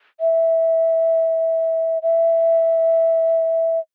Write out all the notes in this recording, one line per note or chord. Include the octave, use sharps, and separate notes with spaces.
E5
E5